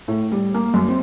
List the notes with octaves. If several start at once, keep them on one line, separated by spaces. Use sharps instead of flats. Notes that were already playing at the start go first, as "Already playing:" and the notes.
A2
G3
A#3
F#2
C4